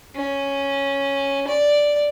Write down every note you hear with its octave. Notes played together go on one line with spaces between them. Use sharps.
C#4
D5